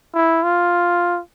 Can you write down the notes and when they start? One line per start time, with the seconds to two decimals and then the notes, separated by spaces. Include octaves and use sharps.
0.15 E4
0.43 F4